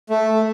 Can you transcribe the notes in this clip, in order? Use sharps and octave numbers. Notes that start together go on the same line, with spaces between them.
A3